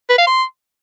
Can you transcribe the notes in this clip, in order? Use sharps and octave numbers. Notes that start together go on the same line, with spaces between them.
B4
F5
C6